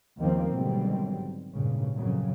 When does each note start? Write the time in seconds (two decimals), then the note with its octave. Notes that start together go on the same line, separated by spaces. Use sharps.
0.19 D#2 D#3 F3 A#3 C4
0.54 G#1 B2 D3 F#3 G3 C4
1.53 G#1 G2 A#2 C#3
1.96 F2 A#2 C#3 F#3